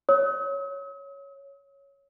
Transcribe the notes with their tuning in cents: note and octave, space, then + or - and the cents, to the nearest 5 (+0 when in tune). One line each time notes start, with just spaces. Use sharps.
C#5 +0 D#6 +45